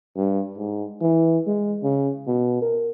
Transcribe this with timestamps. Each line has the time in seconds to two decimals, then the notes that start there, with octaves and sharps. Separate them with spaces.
0.16 G2
0.57 G#2
1.01 E3
1.46 G#3
1.83 C#3
2.27 B2
2.61 A#4